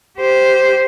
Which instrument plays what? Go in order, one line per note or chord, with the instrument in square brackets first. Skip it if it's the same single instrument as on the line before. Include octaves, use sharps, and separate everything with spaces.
[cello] G4 C5